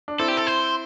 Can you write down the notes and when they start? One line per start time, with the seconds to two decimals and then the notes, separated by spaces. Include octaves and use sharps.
0.08 D4
0.19 C4 E4 A4
0.28 G4
0.37 A4
0.47 C5